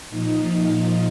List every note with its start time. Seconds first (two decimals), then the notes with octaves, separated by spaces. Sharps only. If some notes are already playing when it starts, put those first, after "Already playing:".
0.11 A#2 F3 D#4
0.51 F4